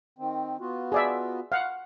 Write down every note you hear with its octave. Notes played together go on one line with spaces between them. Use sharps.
D#3 C4
B3 F4 F#4
G#4 D5 E5
F5 F#5